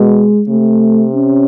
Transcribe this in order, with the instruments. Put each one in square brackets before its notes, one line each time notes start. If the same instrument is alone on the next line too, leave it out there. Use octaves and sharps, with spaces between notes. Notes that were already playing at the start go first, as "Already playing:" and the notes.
Already playing: [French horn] B2 [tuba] G#3
[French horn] C3 [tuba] A3
[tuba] C#4